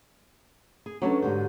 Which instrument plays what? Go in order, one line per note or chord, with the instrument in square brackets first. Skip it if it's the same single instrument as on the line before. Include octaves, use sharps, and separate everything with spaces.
[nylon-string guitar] G#4
[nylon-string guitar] E2 C#4 A5 [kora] F#3 [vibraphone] D4 A4 B4
[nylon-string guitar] G#2 D3 C5 [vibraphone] G4